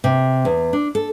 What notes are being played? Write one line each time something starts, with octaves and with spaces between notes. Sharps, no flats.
C3
E2
D4
A4